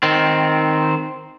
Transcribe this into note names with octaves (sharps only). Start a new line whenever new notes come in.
D#3 C4